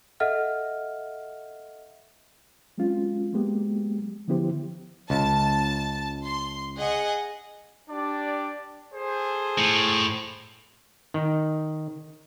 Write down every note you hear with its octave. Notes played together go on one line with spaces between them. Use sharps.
A4 D#5 E5 F#5 F6
F#3 G#3 C4 C#4 F4
F#3 G#3 A#3 B3 G4
D3 F3 B3 E4 G4 C5
C#2 A5
C6
G#4 D#5 F#5
D4 G4 D5
G#4 A4 C5
A2
D#3